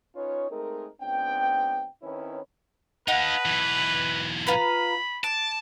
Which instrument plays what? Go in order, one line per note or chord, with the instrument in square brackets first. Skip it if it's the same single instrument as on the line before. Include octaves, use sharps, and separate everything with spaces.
[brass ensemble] C#4 D#4 F4 B4 C#5
G#3 A3 C4 D#4 G#4 A#4
C#2 B3 C4 D4 G5
D#3 C4 C#4 E4 B4 C#5
[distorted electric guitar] D#4 F5 [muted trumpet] B4 [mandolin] D#5 F#5 A5
[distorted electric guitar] B1 E3
[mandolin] F4 B4 A#5 [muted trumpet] B5
[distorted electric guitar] A5 [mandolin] D6